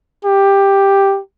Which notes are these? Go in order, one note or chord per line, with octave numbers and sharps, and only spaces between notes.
G4